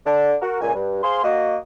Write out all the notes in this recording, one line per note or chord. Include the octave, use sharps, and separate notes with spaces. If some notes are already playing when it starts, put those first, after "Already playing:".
D3 D4
F#4 A#4
C#2 A#2 G#5
G2
G#4 C5 F5 C6
A#3 F#4 D#5